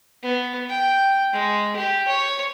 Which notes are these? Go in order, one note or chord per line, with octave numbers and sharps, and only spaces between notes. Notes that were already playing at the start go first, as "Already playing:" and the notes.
B3
G5
G#3
G4
C#5